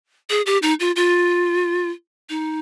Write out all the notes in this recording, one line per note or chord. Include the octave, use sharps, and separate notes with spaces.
G#4
G4
D#4
F4
F4
D#4